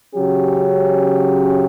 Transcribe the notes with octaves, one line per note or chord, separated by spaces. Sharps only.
C#3 F#3 C#4 G4